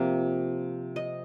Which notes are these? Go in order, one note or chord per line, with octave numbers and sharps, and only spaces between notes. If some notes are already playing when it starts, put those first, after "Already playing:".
Already playing: C3 F3 A#3
D#5